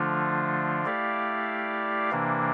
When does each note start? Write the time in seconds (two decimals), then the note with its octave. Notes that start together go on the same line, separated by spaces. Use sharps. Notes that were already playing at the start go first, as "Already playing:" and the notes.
Already playing: D3 F3 A3 D4 F4
0.85 A3 E4 G4 D5 F5
2.11 C3 E3 A#3 D4